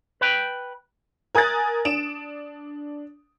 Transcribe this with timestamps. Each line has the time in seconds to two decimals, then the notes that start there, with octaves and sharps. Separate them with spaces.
0.21 B4 G5
1.35 A#4 G#5 D#6 F#6 A6
1.85 D4 D7 E7